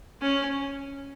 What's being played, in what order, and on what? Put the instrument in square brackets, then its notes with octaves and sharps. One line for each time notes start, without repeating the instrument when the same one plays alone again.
[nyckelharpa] C#4